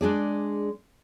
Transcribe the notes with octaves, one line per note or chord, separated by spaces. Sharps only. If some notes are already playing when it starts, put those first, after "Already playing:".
G#3 D4 G#4 D5